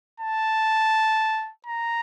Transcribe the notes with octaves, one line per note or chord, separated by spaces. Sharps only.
A5
A#5